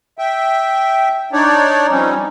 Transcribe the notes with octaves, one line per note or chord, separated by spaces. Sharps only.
E5 G5
D4 D#4 C#5 D5
F3 G3 C4 C#4 D#4